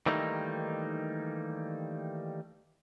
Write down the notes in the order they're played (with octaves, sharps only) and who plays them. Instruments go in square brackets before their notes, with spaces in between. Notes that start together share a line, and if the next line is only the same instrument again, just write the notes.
[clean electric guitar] D#3 E3 G3 A3 A#3 D#4